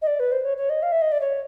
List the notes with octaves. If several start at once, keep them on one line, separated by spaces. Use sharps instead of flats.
D#5
D5
B4
C5
C#5
C#5
D#5
F5
E5
D#5
D5
C#5